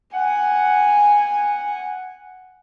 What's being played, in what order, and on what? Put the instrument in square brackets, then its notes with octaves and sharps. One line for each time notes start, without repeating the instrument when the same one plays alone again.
[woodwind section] F#5 [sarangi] G#5